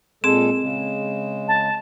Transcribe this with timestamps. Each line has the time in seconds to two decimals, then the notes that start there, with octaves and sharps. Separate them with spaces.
0.24 A#2 G#3 C4 G#4 A4 E7
0.61 C#3 G#3
1.48 A5